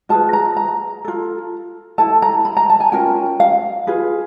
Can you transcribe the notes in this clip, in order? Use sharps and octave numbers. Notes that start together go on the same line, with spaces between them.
F4 G#4 B4 A5
A#5
A#5
F4 A4
E4 A4 A5
A#5
B5
A#5
A5
G#5
C#4 F4 A#4 G5
F5
F4 G#4 B4